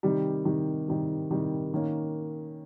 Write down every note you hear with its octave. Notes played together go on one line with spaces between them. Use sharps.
C3 D#3 G3
C3 D#3 G3
C3 D#3 G3
C3 D#3 G3
D#3 A#3 C#4